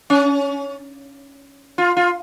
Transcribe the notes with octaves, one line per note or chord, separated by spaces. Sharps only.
C#4
F4
F4